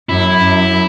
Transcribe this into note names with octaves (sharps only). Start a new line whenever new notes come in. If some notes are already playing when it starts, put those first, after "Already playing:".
F#2 E4
F#2